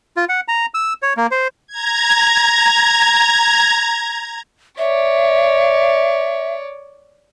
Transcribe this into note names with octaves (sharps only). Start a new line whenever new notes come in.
F4
F#5
A#5
E6
C#5
A#3
C5
A#5 G#6
C#5 D5 E5